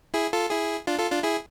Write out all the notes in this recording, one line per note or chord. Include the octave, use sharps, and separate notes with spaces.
E4 G#4
F4 A4
E4 G#4
D4 F4
F4 A4
D4 F4
E4 G#4